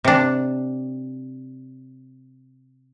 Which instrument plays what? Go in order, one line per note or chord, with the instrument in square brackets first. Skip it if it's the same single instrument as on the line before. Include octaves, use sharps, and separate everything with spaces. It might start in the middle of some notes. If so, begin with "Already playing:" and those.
[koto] C3 D4